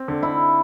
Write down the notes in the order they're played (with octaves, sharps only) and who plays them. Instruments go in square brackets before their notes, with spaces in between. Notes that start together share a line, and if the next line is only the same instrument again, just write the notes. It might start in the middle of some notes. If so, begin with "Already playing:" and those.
Already playing: [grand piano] C4
D3
[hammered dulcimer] E4